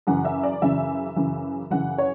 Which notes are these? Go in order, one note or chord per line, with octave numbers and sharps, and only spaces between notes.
F#2 C#3 E3 F#5
E5
D5
F#2 C#3 E3 E5
F#2 C#3 E3
F#2 C#3 E3 F#5
C#5